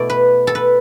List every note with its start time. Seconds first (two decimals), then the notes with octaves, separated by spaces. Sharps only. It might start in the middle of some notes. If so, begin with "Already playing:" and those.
Already playing: B2 A3 E4 D5
0.10 B4
0.47 A4
0.55 B4